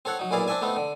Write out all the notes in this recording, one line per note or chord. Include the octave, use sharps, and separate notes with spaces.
C4 A4 C#5 F#5
F#3 D#4
B1 A#2 E4 G#4 D5 F5
C4 D4 D5 E5 G#5
A3 B3 C4 D#4
D3